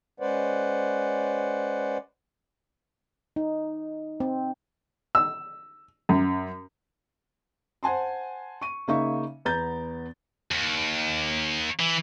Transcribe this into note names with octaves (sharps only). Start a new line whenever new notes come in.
G#3 C#4 B4 C5 D5 F#5
D#4
C4
E6
F#2
C5 F#5 G#5 A5 C6
C#6 D#7
C#3 A#3 D#4 E5 C#6
E2 B3 A#5 G6 A6
D#2
E3